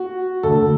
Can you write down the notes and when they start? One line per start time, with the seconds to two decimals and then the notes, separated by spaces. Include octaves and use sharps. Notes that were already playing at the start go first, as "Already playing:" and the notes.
Already playing: F#4
0.43 D2 D3 A3 A4